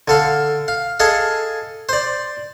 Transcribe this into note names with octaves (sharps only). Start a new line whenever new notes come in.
D3 A4 F5
F5
G#4 A4 D#5 F5
C5 D5